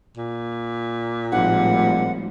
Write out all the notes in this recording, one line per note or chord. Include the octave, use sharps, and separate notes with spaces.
A#2
G#1 A2 F3 G3 F#5